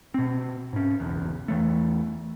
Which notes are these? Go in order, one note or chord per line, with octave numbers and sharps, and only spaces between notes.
B2 C4
G#2 C#4
F#1 B1 E2
E2 E3 A3